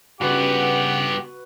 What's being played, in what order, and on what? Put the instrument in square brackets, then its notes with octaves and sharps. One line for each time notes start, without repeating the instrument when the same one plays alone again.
[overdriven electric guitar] G2 B3 [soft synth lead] C#3 [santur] F#4 B4 [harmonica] G4 F#5 D6